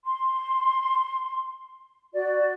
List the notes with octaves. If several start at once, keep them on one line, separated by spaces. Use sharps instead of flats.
C6
F#4 D5